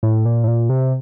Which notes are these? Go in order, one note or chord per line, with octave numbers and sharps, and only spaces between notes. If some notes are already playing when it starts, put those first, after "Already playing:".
A2
A#2
A2
A#2
C3